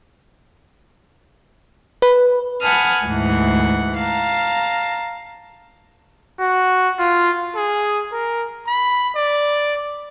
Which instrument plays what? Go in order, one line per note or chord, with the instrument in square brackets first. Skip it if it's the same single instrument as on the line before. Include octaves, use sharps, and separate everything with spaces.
[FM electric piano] B4
[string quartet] F#5 G#5 A5 B5 D#6 F6
D2 G#2 E3 F#5
F5 A5 A#5
[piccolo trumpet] F#4
F4
[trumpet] G#4
A#4
B5
D5